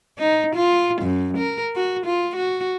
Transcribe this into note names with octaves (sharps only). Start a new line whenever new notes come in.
D#4
F4
F#2
A#4
F#4
F4
F#4